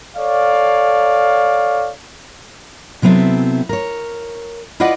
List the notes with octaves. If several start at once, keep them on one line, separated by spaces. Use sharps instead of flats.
A4 C#5 D5 F5
C3 F#3 B3 C4 E4 A4
A#4 C#5
E4 F4 B4 D5 D#5 F#5